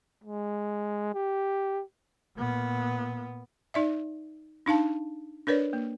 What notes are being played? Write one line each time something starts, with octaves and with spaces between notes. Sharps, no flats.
G#3
G4
A#2 B3
D#4 D5 E5
D4 D#4 F5 A5
D4 A#4 B4 C#5 D5
A#3